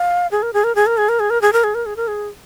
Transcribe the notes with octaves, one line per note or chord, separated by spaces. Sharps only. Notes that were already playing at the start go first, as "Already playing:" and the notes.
Already playing: F5
G#4
A#4
G#4
A#4
G#4
A#4
G#4
A#4
G#4
A#4
G#4
A#4
G#4
A#4
G#4
A#4
G#4